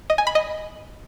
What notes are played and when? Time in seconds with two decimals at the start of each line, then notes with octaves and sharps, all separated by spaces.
0.10 D#5
0.18 G#5
0.27 B5
0.35 D#5